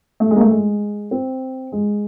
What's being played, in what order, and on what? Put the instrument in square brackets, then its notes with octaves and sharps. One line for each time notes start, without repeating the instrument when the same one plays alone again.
[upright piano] A3
G#3
A#3
A3
G#3
C4
G#3